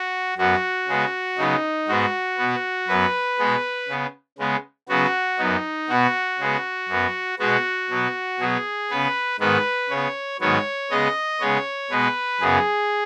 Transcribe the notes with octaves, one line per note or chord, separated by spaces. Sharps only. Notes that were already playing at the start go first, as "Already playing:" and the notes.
Already playing: F#4
F#2 F#3 B3 F#4
C#3 G#3 B3
C#3 F#3 B3 D#4
G#2 G#3 B3 F#4
B2 B3
F#2 F#3 B3 B4
B2 G#3 B3
C#3 B3
C#3 G#3 B3
C#3 F#3 B3 F#4
F#2 F#3 B3 D#4
B2 B3 F#4
C#3 G#3 B3
F#2 F#3 B3
B2 G#3 B3 F#4
B2 F#3 B3
B2 F#3 B3 G#4
C#3 B3 B4
G#2 D#3 B3 B4
C#3 B3 C#5
G#2 D#3 F#3 B3 C#5
C#3 G#3 B3 D#5
C#3 G#3 B3 C#5
B2 G#3 B3 B4
F#2 C#3 B3 G#4